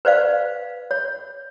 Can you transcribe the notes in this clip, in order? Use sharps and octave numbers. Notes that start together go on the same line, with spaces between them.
B4 C5 D5 F5
C#5